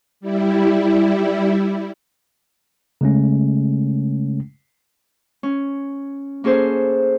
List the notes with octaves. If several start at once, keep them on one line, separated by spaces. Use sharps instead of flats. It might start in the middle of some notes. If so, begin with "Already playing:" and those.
G3 E4
C#3 G#3 A3 C#4
C#4
A#3 C#4 G#4 A4 C5